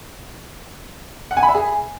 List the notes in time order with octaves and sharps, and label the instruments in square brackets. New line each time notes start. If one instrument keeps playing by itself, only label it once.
[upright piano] F#5
G#5
B5
E5
G#4